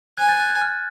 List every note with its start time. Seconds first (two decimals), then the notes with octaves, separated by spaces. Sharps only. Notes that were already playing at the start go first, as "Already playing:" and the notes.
0.17 G#5 F#6 G#6
0.29 G6 A6
0.40 F#6 G#6
0.50 F#6
0.62 F6